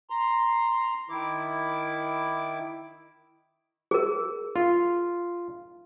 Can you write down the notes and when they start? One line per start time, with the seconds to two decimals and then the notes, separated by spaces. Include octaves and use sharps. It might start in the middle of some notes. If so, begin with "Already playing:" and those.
0.10 A#5 C6
1.10 D#3 E4 D6
3.91 G#4 A#4
4.56 F4